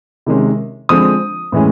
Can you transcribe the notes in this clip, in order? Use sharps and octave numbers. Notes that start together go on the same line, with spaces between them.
C3 D#3 G#3 C#4
D3 F3 G#3 C4 D#6
A2 E3 G#3 C#4